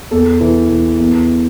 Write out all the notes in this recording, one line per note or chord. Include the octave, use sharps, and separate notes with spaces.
E2 A4
E3
E3
E2